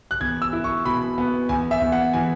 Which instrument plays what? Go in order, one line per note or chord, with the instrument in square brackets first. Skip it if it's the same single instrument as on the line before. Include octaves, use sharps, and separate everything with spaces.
[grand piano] F#6
E2 G#6
E6
E4
C#6
B2 B5
B3
E2 G#5
E5
E2
F#5
E3 G#5